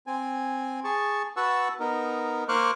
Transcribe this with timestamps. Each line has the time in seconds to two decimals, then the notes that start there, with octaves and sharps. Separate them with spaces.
0.07 C4 G#5
0.84 G#4 A5 C#6
1.37 F#4 B4 F#5 A5 C#6 E6
1.80 B3 D#4 A#4
2.48 A#3 C5 C#6 D6 F6 F#6